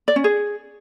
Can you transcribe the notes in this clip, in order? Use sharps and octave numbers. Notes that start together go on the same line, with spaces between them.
D5
C#4
G#4